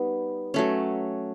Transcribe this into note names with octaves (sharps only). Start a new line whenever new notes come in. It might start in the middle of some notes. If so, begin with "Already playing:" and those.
Already playing: G3 B3 D#4
F#3 A3 C#4